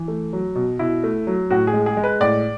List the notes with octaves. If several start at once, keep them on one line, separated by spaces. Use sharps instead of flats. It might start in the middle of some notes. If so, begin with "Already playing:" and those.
Already playing: E3
A3
F#3
B2
B2 E4
A3
F#3
A2 F#4
G#4
G#3
G#4
G#3
B4
A2 D5